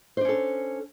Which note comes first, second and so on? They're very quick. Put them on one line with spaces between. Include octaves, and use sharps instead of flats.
C5 D4 C#4 A4